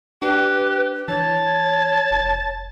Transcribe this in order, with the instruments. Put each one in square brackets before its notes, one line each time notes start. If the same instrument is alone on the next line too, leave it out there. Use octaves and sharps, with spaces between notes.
[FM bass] D4 [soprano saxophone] G4 [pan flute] B4
[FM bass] E3 [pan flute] C#5 [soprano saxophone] A5
[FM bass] F1